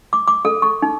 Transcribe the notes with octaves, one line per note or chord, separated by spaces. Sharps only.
D6
D6
A4
C#6
D#4